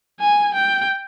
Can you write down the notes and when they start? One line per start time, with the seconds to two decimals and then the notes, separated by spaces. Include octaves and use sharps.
0.20 G#5
0.54 G5